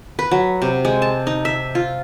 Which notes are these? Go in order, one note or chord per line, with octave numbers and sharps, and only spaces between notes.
B4
F#3
C3
G#3
A5
D#4
E5
F4